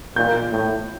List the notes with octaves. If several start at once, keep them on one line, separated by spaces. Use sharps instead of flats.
A#2 G6
A2